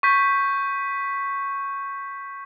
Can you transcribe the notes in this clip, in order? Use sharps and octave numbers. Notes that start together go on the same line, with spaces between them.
C#6 G6 B6